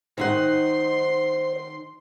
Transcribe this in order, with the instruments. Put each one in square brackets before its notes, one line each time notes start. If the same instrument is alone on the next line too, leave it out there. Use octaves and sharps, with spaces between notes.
[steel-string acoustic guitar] D#3 D#4 F#5 [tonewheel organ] C5 [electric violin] C6